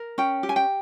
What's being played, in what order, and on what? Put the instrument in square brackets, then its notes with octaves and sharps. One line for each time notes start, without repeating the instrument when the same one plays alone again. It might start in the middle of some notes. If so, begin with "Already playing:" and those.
Already playing: [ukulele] A#4
C#4 G5
G4
G#5
G5